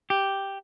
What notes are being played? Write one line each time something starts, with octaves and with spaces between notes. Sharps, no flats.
G4